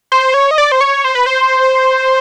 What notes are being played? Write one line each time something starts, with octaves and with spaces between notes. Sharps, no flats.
C5
C#5
D#5
D5
C5
C#5
C5
B4
C5